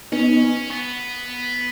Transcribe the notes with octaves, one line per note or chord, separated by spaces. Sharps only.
B3 C#4 D#4
B3